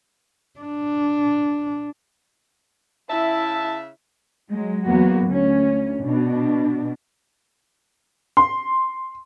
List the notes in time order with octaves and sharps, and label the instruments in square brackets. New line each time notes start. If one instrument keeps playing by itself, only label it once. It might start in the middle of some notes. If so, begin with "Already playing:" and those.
[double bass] D4
[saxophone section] C#3 E5 [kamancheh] E4 [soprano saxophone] A5
[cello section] F#3 G#3
E2 F#3 A#3 B3 F#4
D2 C#4
B2 D4
[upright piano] C6